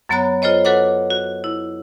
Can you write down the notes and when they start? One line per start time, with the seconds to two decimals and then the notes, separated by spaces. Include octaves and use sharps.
0.09 F#2 F#3 B3 C#5 A#5 F#6
0.42 F4 A4 C5 C#5 D#5
0.65 F#4 A4 B4 C#5 F#5 D6
1.11 F#4
1.44 E4